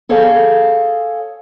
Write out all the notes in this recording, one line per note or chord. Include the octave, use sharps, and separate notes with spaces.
G#4 A4 C#5 D5 F5 G#5